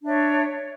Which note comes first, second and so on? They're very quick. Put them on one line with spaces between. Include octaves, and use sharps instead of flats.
D4 E5 C#5